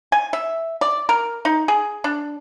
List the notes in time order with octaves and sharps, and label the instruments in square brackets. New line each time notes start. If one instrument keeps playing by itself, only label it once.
[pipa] G#5
E5
D5
A#4
D#4
G#4
D4